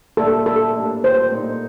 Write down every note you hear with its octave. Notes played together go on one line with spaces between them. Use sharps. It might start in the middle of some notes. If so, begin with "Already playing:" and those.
A#2 G3 D4 A4
A4
A2 G3 A#3 D4
C5
A#2 A3 D#4